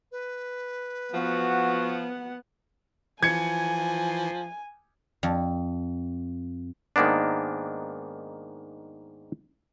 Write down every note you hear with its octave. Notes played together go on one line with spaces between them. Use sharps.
B4
F3 B3 F#4 F#5
E3 F3 G#5 G#6 C#7
F2
G#2 D#3 A#3 B3 D4